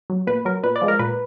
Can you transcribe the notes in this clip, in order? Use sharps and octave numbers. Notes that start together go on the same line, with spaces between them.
F#3
A#2 B4
F#3 A#4
A#2 B4
D5
F3 G#3
A#4
A#2 B4